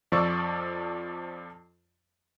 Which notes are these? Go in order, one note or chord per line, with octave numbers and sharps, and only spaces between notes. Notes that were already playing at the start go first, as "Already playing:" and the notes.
F2 F3 F4 D5 C#6 E6